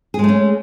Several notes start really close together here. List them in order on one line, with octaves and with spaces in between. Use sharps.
G#4 G#3 A3 C#4